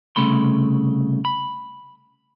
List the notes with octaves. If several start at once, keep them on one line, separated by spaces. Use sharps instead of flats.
C2 C#3 A3 B5 C6
B5